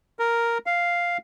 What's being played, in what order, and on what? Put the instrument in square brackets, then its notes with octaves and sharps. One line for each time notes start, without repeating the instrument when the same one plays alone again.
[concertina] A#4
F5